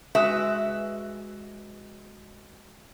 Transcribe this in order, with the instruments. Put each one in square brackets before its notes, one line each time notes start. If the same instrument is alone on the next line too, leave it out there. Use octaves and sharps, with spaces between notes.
[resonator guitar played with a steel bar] G#3 F#4 B4 E5